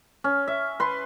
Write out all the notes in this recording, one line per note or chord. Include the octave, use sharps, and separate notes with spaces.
C#4
E5
B4 C6